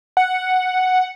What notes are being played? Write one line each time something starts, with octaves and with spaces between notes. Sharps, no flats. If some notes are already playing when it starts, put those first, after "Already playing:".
F#5